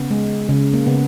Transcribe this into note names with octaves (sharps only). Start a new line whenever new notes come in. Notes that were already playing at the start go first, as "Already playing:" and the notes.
Already playing: C#3 B3
G#3
C#3
A#3
C#3 B3